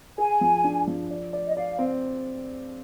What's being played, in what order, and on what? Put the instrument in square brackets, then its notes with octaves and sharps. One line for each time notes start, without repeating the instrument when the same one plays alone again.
[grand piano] G#4 [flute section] G#5
[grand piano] F3
D4
F3
D5
D5
[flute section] D#5
[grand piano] D5 [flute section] F5
[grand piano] C4